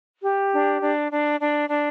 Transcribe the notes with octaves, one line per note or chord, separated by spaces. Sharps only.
G4
D4
D4
D4
D4
D4